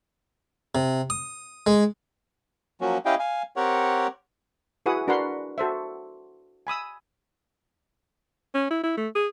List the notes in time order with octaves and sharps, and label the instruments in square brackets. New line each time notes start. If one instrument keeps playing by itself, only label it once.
[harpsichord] C3
D#6
G#3
[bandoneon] F3 F#3 A#3 C#4 F#4
C#4 E4 G4 D#5 F5 G5
F5 G#5
C4 G4 A#4 C#5 F#5
[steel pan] E4 F#4 G#4 B4 F#5 D#6
D4 F#4 A#4 B4 F#5 C6
F#4 A4 C5 E5
G#5 B5 D#6 E6
[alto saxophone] C#4
E4
E4
A3
G#4